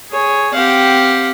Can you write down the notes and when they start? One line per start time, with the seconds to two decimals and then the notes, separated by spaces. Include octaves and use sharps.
0.11 G#4 C#5
0.54 C4 G4 F5 F#5